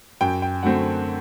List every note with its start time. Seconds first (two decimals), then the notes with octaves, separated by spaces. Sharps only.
0.21 F#2 G5
0.42 G5
0.63 D3 F#3 A3 C4 F#5